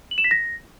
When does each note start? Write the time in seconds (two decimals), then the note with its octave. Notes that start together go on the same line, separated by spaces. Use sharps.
0.11 F#7
0.18 E7
0.24 B6
0.31 A#6